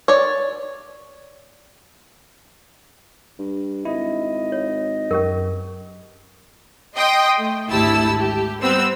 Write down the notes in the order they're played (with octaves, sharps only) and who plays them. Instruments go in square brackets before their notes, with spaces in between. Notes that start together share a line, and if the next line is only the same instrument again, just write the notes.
[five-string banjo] C#5 D5
[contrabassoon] G2
[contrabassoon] G#1 [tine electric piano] E4 [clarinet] D#5
[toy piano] C#5
[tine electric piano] F#2 [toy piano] C#4 G4 A#4
[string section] D#5 G5 C6 D#6
A3
G#1 D2 E4 G4 A5 E6
G4
G3 B3 C4 E6